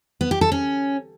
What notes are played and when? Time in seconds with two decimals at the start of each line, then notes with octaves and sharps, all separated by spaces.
0.21 B3
0.31 G4
0.41 A4
0.52 C#4